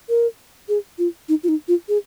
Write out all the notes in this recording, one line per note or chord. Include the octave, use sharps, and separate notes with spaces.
A#4
G#4
F4
D#4
F4
D#4
F4
G#4